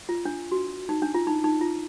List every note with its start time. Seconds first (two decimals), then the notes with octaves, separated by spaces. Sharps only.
0.09 F4
0.25 D4
0.52 F#4
0.89 D#4
1.02 D4
1.14 F4
1.27 D#4
1.44 D#4
1.61 F4